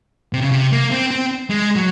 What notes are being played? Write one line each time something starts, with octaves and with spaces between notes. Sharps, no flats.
C3
C#3
C3
A#3
C4
C4
G#3
F#3